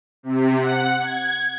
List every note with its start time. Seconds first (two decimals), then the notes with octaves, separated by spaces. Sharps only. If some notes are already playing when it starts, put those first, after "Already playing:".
0.23 C3
0.57 F#5
1.00 G#6